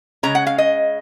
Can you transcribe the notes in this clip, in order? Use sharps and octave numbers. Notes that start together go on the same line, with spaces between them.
C#3 G#3 C#4 A#5
F#5
F5
D#5